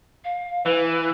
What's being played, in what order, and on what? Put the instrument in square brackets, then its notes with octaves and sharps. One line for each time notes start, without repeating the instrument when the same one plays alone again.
[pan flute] F5
[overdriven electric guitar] E3 [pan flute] B4